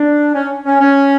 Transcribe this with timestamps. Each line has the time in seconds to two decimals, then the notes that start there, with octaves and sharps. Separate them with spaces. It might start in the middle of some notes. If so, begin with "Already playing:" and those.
Already playing: D4
0.34 C#4
0.66 C#4
0.81 C#4